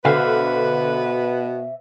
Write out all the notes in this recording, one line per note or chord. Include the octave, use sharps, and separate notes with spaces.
B2 D3 F#4 B4 C5 E5 F5